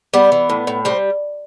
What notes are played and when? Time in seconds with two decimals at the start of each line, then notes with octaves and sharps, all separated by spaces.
0.14 G3 B3
0.32 E3
0.50 A2
0.67 A2
0.85 G3 C4